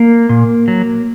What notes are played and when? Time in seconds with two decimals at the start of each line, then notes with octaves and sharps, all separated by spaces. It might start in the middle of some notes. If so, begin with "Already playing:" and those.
Already playing: A#3
0.29 A#2
0.68 F#3